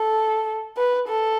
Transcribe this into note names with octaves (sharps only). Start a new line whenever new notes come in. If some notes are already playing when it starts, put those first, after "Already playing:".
Already playing: A4
B4
A4